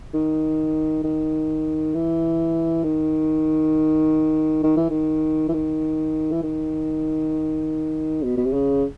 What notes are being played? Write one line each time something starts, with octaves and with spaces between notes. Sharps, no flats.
D#3
D#3
E3
D#3
D#3
E3
D#3
E3
D#3
E3
D#3
B2
B2
C3
C#3